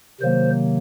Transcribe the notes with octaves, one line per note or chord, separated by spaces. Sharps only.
C3 D#3 F#3 A#3 C5